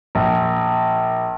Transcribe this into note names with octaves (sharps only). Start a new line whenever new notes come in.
A#1